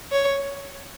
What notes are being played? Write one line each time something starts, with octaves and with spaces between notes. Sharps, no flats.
C#5